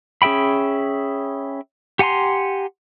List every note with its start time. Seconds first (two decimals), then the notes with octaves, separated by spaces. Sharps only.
0.22 C#4 G#4 E5 G5 B5
1.99 G4 F#5 G#5 A#5 C6